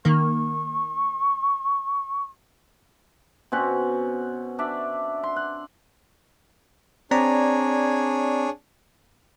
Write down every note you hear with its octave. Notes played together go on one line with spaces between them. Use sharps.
D#3 A#3 C#6
B2 C4 C#4 F#5
D4 D5 E5
C6
F#5
C4 D4 G#4 C#5 D5 A#5